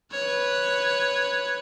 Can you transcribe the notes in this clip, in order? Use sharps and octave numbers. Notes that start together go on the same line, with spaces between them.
B4 C#5